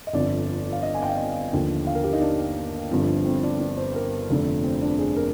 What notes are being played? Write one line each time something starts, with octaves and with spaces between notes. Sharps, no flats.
D#5
G1 F2 D3 F3 D5
F5
D#5
G#5
G5
F5
D#5
D#2 D3 F3
F5
A#4
G4
D#4
D4
G1 G2 D3 F3 C4
C4
D4
D4
C5
A#4
F1 F2 D3
C4
D4
G#4
A#4